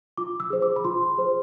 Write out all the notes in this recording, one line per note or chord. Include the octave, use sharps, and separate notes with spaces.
F4 D6
E6
G#4 C5
D6
B5
F4 C6
G#4 C5